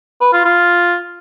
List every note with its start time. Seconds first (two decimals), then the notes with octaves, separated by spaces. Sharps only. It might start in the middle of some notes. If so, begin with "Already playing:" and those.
0.21 B4
0.33 F4
0.45 F4